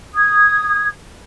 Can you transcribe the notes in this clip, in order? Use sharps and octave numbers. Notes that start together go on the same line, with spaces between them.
D#6 G#6